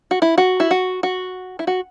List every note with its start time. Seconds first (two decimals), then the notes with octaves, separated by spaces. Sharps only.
0.11 F#4
0.22 E4
0.38 F#4
0.60 E4
0.71 F#4
1.03 F#4
1.59 E4
1.67 F#4